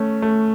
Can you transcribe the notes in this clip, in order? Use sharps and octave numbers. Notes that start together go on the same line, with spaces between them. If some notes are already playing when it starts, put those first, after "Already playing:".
Already playing: A3 C#4
A3